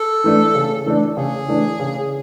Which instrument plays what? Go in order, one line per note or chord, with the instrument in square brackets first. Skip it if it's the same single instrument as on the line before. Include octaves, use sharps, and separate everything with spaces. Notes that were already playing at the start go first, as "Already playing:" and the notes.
Already playing: [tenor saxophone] A4
[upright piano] E3 A3 D4
C#3
E3 A3 D4
[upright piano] C#3 [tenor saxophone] G#4
[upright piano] E3 A3 D4
C#3